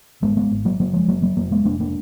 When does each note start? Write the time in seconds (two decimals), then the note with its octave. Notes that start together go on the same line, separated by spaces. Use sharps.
0.22 G#1 G#3 B3
0.37 G#3 B3
0.51 G#1
0.65 F#3 A#3
0.79 F#1 F#3 A#3
0.93 F3 G#3
1.08 F#1 F#3 A#3
1.22 F#3 A#3
1.36 F1 F#3 A#3
1.51 G#3 B3
1.65 F1 A#3 D4
1.80 A#3 D4